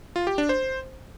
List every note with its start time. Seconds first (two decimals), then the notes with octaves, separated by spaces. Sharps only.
0.16 F4
0.27 G4
0.38 D4
0.49 C5